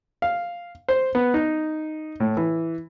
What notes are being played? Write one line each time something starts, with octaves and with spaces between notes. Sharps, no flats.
F5
C5
B3
D#4
A2
E3